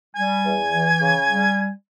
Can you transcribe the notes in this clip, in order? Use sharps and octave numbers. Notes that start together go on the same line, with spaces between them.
G3 G#5
E2
E3
C#3
G3